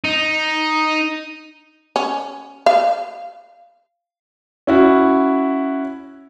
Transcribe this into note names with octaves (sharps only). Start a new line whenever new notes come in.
D#4
C#4
F5
C#4 E4 F#4